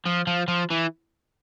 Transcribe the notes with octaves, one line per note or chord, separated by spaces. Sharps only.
F3
F3
F3
E3